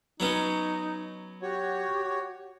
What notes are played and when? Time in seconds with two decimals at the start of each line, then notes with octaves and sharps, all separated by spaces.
0.20 F#3 B3 C#4 D#4
1.42 F#4 G4 C#5